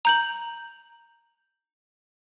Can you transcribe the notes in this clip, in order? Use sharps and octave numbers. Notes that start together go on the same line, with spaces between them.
A#5 G6 F#7